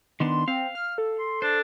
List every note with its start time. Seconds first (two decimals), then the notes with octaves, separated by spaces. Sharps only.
0.20 D#3 B3 D4 C6
0.48 C4 F5
0.75 F6
0.98 A4
1.19 C6
1.42 D4 C5